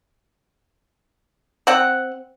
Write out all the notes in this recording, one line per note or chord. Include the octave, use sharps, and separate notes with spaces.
C4 F#5